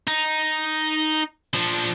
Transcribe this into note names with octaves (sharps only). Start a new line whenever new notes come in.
D#4
F3 D4